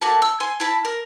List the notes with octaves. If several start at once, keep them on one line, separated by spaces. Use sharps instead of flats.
A3 A#3 F#4 A5
E6
G#5 C6
E4 A5 B5
A#4